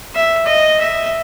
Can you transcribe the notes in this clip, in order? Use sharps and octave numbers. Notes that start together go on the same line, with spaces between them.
E5
D#5
E5